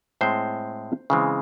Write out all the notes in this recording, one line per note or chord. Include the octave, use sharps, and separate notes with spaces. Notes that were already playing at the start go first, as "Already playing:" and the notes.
A2 G#3 C4 C5
C#3 E3 G#3 C4